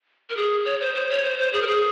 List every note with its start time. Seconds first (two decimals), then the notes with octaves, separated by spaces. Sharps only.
0.30 A#4
0.37 G#4
0.65 C#5
0.81 C5
0.95 C5
1.10 C#5
1.24 C5
1.39 C5
1.53 G#4
1.61 A#4
1.67 G#4